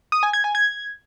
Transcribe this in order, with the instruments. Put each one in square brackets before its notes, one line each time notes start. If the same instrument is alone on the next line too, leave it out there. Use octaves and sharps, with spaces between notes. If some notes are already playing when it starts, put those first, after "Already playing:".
[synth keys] D#6
G#5
G#6
G#5
G#6